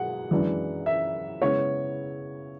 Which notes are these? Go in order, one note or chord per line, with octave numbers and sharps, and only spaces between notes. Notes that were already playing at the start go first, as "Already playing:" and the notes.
Already playing: B2 G#3 F#5
F#2 E3 G#3 D4
E5
C#3 G#3 B3 E4 C#5